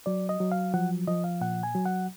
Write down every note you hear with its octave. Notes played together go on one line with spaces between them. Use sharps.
F#3 D5
D#5
F#3
F5
F3 F#5
F3 D#5
F5
A#2 F#5
G#5
F#3
F#5